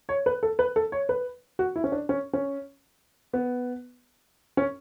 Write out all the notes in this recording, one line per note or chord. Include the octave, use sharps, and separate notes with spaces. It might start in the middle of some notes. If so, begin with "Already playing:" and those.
C#5
B4
A4
B4
A4
C#5
B4
F#4
E4
C#4
D4
C#4
C#4
B3
C#4